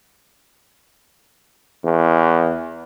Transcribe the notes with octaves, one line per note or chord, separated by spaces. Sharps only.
E2